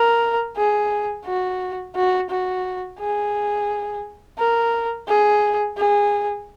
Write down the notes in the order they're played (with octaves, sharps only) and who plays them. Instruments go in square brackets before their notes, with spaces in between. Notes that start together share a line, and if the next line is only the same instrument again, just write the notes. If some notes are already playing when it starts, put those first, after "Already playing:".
Already playing: [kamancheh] A#4
G#4
F#4
F#4
F#4
G#4
A#4
G#4
G#4